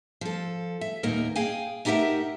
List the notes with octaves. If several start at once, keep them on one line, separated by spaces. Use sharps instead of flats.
F3 A4
E5
D#2 A#2 A#3 B3 D#4 A#4
G#4 F5 G5 G#5
A3 D#4 G4 A#4 E5 F#5